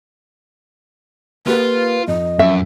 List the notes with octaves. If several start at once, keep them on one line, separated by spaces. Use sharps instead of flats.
A#3 F4 G4 B4
F2 D#5
F#2 E5